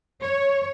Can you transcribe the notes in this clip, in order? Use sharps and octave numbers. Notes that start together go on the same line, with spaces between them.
C#5